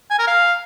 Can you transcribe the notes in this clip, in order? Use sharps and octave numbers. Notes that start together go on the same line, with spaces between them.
G#5
A#4
F5